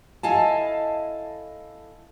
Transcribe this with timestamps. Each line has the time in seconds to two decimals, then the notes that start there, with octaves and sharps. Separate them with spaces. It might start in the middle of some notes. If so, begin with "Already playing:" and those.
0.23 E4 A4 D#5 F5 G#5 A5